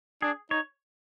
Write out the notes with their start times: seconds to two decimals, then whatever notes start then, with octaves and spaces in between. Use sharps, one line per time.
0.22 D4 G#4
0.51 D#4 C#5